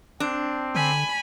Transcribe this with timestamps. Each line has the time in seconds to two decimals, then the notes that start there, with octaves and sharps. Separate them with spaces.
0.20 C4 D4
0.75 D3 G#5 B5